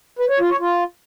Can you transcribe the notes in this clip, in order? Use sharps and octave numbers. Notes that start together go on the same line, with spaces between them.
B4
C#5
F4
C#5
F4